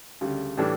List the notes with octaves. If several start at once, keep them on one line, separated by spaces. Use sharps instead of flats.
D2 C#3 G3
A2 E3 G3 D4 A4